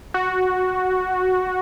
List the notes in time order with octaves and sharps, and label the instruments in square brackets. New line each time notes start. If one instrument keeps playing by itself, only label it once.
[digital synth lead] F#4